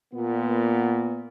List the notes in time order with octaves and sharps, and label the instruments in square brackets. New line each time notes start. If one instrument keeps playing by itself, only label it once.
[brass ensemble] A#2 B3